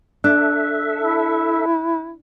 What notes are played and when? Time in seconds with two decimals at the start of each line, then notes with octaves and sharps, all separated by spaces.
0.24 D4 A4 E5 F#6
1.01 E4